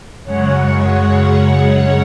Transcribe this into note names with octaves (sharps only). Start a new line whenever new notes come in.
F#2 C#3 G#3 C#5 F#5
C#5 F#5